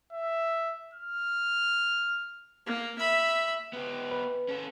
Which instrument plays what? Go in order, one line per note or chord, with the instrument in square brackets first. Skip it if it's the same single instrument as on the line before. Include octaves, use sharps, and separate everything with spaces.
[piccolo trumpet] E5
F6
[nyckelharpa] A#3
E5 B5
[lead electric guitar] B3 G4
[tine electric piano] B4
[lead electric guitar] C#4 A4